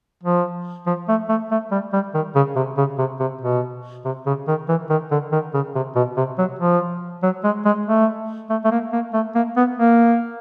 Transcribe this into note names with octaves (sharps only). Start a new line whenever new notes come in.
F3
F3
A3
A3
A3
G3
G3
D#3
C#3
C3
C#3
C3
C3
B2
C3
C#3
D#3
E3
D#3
D3
D#3
C#3
C3
B2
C3
F#3
F3
F#3
G#3
G#3
A3
A3
A3
A#3
A#3
A3
A#3
B3
A#3